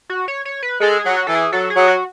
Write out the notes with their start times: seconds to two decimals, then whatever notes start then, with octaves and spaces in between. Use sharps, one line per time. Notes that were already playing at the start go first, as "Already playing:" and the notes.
0.09 F#4
0.28 C#5
0.45 C#5
0.62 B4
0.81 G#3 A4
0.99 G#4
1.05 F#3
1.16 F#4
1.27 E3 A4
1.35 G#4
1.52 F#3 A4
1.70 G#4
1.76 F#3
1.88 F#4